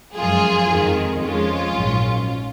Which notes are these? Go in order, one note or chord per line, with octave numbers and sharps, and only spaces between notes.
F#2 F3 G#3 F4 G#4
F2 D#3 G#3
F2 F3 G#3 C#4 F4
A#1 G#2 F#3